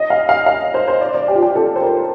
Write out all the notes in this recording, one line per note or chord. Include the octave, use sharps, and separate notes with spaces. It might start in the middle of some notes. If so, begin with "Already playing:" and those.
Already playing: D#5
F5
F5
F5
C5
C5
D5
D5
G4
F4
G4
A4
C5
A#4